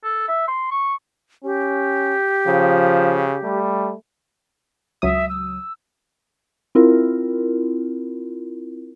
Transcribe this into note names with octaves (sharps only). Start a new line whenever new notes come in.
A4
E5
C6
C#6
C#4 G4
C#3 F3
G3 A3
C#2 F#3 E5 D#6
E6
C4 E4 F4 A#4